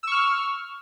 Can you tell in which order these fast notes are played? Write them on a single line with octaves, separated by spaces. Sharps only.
E6 C#6 F6